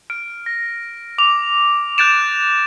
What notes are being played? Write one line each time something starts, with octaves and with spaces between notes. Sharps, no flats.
F6 D7
A#6
D6 F7
F#6 G6 A6 D7 E7